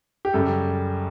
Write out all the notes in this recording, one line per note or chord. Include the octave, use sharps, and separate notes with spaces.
G4
F#2 C#3 G3 A4